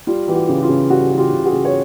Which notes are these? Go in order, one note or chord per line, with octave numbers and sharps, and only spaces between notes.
G3 F4
E3 G4
F#4
C#3
F4
C#3
G3 F#4
E3
F4 G4
C#3
F#4 G#4
C#3
C#5